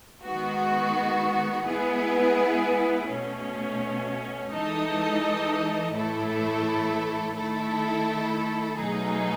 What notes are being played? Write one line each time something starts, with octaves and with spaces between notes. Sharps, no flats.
D#3 G#3 B3 F#4
G#3 B3 E4 G#4 B4
B2 A3 C#4
E3 G#3 D#4 A4 D#5
A2 E3 A3 E4 A4
D#3 A3 E4 A4
B2 F#3 A3 D#4 G#4